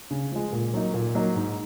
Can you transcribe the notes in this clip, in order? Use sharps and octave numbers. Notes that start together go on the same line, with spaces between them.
C#3
F3 G#3
A#2
F#3 A#3 D#4
A#2
F#3 A#3 D#4
G#2